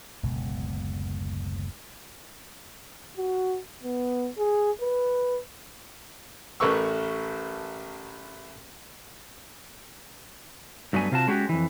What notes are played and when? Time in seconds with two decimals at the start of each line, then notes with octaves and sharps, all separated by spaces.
0.23 F#1 D2 B2 G#3
3.17 F#4
3.83 B3
4.38 G#4
4.81 B4
6.60 A1 A3 A#4 B4 C#6 E6
10.93 G2 F#3 A3 B3 G#5
11.12 C3 F4 F#4 A5
11.28 G#3 C#4 F#4 G4
11.49 F2 E3